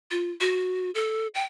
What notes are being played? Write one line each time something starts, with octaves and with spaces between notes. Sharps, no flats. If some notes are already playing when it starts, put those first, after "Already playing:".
F4
F#4
A4
G5